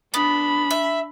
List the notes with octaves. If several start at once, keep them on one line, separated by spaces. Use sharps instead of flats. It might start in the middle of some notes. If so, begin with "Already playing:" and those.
B3 D4 B5
E5